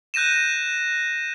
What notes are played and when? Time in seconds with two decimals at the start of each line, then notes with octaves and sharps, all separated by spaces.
0.14 F#6 G6 A#6 D#7 E7